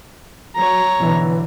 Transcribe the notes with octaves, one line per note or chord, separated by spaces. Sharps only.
F#3 C#5 A#5
B1 D3 E3